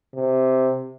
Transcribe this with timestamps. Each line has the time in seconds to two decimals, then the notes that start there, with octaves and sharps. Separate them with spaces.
0.15 C3